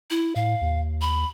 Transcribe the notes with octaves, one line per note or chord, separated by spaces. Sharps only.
E4
A2 F5
D#2
B5